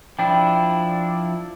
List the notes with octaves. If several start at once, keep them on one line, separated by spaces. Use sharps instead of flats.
F3 D4 E4 G5